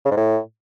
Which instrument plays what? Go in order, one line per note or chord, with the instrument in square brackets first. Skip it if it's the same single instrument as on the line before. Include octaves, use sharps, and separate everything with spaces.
[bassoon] C#3
G#2
A2